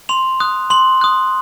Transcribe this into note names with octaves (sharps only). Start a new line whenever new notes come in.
C6 F7
D#6 F#6
C6 F#7
D#6 F#6